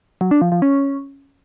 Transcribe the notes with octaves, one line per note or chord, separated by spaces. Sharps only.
F#3
D4
F3
F3
C#4